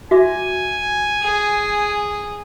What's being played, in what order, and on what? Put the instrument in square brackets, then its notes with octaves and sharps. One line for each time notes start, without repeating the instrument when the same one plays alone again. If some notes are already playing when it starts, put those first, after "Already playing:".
[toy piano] F#4 E5 D6 [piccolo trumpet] G#5
[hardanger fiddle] G#4